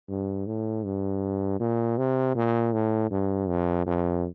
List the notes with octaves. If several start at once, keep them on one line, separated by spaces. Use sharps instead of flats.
G2
A2
G2
A#2
C3
A#2
A2
G2
F2
F2